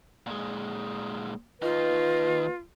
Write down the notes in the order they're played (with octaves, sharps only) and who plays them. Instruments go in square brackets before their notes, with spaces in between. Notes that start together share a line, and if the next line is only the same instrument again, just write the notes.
[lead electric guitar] A#2 G#3
[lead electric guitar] D#2 D#4 [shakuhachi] F4 [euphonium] B4